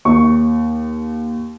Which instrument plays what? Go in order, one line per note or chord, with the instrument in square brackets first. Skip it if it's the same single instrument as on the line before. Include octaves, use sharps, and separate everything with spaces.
[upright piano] D#2 C#6